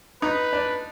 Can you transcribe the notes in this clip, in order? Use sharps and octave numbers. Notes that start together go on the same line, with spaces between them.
D#4 B4
D4